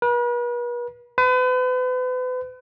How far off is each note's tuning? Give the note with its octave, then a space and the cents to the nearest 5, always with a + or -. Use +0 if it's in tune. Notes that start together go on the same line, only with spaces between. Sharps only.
B4 -40
B4 +40